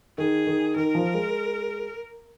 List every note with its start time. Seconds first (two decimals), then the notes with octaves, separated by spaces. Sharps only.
0.18 D#3 G#4
0.47 D#3
0.76 D#3 A#4
0.95 F3
1.14 G#3